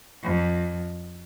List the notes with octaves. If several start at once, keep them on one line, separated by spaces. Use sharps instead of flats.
F2